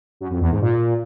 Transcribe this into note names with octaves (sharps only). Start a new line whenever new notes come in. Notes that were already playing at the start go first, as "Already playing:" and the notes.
F#2
F2
E2
G#2
A#2